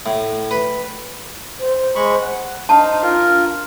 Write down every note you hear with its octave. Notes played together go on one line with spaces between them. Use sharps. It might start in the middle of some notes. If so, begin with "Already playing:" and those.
A2
B4
C5
G#3 B5 C#6
F#5
D4 D#4 C5 F5 A5
F4 A#4